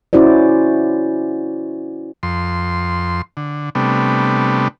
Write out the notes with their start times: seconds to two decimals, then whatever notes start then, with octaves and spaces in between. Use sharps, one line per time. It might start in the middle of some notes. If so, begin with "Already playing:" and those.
0.13 C#4 E4 F#4 C5 D5
2.23 F2 C6
3.37 D3
3.75 C3 G3 A3 B3 D4